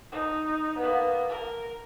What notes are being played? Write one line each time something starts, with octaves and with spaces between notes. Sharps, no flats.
D#4
A#3 B3
A#4